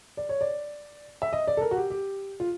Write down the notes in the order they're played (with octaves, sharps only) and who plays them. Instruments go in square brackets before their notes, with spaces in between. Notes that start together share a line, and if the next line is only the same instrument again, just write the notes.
[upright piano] D5
C#5
D5
E5
D#5
D5
A4
A#4
F#4
G4
G4
F4